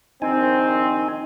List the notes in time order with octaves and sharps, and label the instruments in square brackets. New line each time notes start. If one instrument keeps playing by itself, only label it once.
[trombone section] A#1 D#3 C4 [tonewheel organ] D#4 G#5